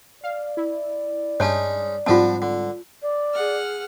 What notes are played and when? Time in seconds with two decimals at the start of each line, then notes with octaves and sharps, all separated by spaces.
0.24 D5 F5
0.57 E4
1.40 G2 G#3 C#4 D#4 C#5 A5
2.06 G#2 F3 G3 C4 D4 F4 F#4 A5
2.42 D3
3.02 D5
3.34 G#4 F#5 F6